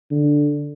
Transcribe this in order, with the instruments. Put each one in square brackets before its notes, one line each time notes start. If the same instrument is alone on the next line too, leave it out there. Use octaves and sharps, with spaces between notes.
[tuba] D3